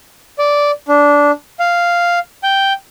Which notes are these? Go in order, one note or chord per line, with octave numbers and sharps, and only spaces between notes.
D5
D4
F5
G5